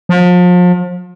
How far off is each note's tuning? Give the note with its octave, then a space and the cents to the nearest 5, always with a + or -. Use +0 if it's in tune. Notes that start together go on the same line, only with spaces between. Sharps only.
F3 +35